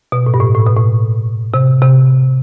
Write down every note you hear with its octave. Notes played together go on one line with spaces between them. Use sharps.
B2
A2
G2
A2
A2
B2
A2
C3
C3